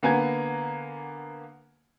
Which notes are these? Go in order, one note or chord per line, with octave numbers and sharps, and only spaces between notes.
D3 A#3 B3 G#5 A#5 G#6